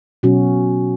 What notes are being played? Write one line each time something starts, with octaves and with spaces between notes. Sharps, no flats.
B2 F#3 C#4 F#4